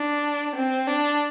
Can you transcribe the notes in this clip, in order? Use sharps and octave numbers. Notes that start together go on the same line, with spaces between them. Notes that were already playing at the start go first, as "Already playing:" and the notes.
Already playing: D4
C4
D4